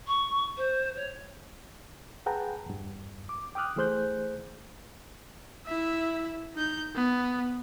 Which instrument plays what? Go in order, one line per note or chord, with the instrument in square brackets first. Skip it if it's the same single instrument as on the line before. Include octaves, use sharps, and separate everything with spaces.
[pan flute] C#6
C5
C#5
[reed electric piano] G#4 B4 F#5 G5 A5 A#5
E2 G2
D6
G5 D6 D#6 F6 F#6
E3 A3 G#4 C5 F#6 G6
[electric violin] E4 E5
D#4 G6
B3